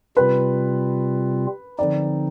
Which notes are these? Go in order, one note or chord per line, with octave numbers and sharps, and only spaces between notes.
C3 G3 C4 F4 B4
D3 F3 C4 D#4 D5